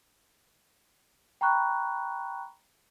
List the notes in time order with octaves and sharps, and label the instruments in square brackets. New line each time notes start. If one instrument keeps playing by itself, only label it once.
[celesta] G5 A#5 B5 C#6 F#6